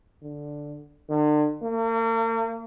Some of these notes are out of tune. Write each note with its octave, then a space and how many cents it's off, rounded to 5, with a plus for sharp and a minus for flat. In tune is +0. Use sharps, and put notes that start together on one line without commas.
D3 +0
D3 +40
A#3 -40